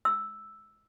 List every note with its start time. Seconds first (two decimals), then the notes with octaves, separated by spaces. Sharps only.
0.05 E6